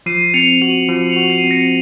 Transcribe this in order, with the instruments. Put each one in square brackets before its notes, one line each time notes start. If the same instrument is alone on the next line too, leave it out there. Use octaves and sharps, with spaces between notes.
[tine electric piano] F3 [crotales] C7 D#7
[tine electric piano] C4 [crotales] C#7 F7
[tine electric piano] F#4 [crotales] D#7 F#7
[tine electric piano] F3 [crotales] C#7 F7
[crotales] C#7 F7
[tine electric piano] F#4
[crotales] C7 D#7
[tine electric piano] C4
[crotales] A#6 C#7